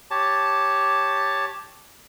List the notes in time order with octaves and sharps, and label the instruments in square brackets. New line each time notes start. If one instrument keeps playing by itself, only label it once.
[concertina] G4 C#5 A5